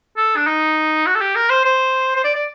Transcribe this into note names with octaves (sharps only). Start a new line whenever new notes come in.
A4
D4
D#4
F#4
A4
G4
A#4
C5
C5
C5
D5
D5